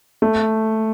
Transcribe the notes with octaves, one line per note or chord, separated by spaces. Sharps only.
A3